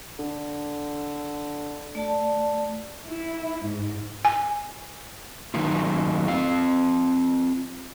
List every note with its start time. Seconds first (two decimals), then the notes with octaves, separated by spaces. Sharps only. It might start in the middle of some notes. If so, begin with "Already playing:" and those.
0.19 D3
1.95 A3 D5 A5
3.05 E4
3.64 G#2
4.25 G#5
5.54 D#3 F#3 A3 A#3 D#4 F4
6.28 C4 F4 F5